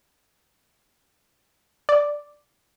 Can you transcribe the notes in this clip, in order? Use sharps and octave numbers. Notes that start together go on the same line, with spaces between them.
D5